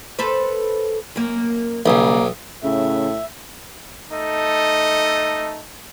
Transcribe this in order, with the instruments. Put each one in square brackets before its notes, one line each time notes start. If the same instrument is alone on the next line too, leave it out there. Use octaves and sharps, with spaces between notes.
[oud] A4 B4 C5
F#2 A#3
[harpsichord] B1 [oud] C#3 G3 [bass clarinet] A#3
[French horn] A2 [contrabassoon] C#3 [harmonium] E5
[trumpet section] A3 D#4 A4 D#5